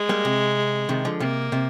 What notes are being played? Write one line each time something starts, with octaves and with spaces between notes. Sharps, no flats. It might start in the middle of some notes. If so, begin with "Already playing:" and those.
Already playing: G#3
G3 A#3
C3
C3 D#3
D3 F3
C3 A#3
C3